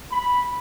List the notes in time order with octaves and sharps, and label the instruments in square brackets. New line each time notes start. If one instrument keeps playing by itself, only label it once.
[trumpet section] B5